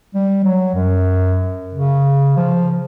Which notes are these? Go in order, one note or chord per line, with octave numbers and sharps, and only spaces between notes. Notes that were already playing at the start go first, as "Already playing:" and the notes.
G3
F#3
F#2
C#3
F3